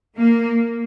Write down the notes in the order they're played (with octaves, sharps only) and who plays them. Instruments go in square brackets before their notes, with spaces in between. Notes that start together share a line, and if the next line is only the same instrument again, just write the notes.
[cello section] A#3